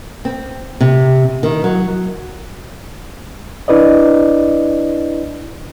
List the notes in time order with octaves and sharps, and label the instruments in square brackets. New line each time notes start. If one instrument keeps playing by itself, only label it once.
[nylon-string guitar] C4
C3
D#3
F#3
[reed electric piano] D4 E4 B4 D5 D#5